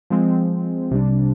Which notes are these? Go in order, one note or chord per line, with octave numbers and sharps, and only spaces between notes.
F3 G#3 C4
C2 C3 G3 D4